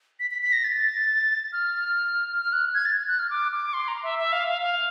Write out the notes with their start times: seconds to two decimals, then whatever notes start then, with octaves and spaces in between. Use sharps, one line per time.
0.20 B6
0.31 B6
0.42 B6
0.52 A#6
0.64 A6
1.53 F6
2.40 F6
2.53 F#6
2.75 G#6
2.85 A6
3.08 F#6
3.19 F6
3.30 D6
3.52 D6
3.73 C6
3.88 A#5
4.03 E5
4.19 E5
4.32 F5
4.48 F5
4.62 F5